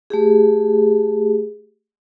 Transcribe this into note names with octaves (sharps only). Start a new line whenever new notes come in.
A3 G4 G#4